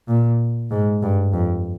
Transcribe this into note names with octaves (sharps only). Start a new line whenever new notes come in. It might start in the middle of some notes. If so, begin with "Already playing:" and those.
A#2
G#2
G2
F2